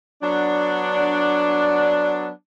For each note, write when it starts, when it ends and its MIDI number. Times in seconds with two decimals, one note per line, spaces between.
0.22 2.29 54
0.22 2.29 59
0.22 2.29 62